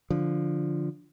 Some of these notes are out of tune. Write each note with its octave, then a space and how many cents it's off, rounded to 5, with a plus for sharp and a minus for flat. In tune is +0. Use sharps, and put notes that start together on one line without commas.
D3 +0 F3 +0